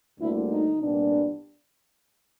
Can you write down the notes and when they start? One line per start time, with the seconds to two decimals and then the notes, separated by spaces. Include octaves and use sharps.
0.20 D2 D3 G3 A#3 E4
0.49 D#4
0.79 C2 A#2 G3 B3 D4